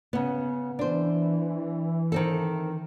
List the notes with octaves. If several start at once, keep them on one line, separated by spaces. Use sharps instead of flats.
C#3 B3
E3 D4 C5
D#3 C4 A4